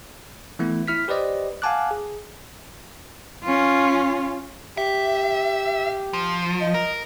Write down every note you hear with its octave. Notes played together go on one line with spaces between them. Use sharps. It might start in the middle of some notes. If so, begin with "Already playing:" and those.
E3 A3 B3 E4
E4 F6 B6
G4 B4 C5 D5 D#5
F5 F#5 G#5 A5 D6 F#6
G#4
C#4 F4
G4 E5
F3
D#5
A#4